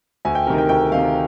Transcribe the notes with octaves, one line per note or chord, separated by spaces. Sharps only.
D2 G#5
G5
C3 D#3 A#4
G5
D2 G5
C3 D#3 F5